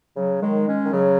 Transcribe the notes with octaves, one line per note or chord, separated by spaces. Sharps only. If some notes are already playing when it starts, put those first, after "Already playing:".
C#3 F#3
D#3 G#3
G#3 C#4
D#3
C#3 F#3